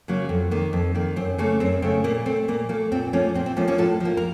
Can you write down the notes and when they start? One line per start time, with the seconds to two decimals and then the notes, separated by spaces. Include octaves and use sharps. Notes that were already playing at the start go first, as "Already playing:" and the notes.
0.08 C#3 F#3 A#3
0.29 F2
0.51 D#3 A#3
0.73 F2
0.95 D#3 A#3
1.16 F#2 C4
1.38 C#3 A3 A#3
1.60 F#2 C4
1.82 C#3 A3 C4
2.04 A#2 A#3
2.26 A3 C4
2.48 A#2 A#3
2.69 A3 A#3
2.92 A#2 C4
3.13 F3 A3 A#3 C#4
3.34 A#2 C4
3.46 C4
3.57 F3 A3 A#3 C#4
3.68 A#3 C#4
3.78 A2 F4 A4
4.00 F3 A#3
4.17 A#4